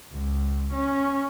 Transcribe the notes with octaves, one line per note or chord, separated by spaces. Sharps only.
C#2
C#4